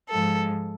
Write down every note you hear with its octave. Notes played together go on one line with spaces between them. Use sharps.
G#2 F3 G#3 A4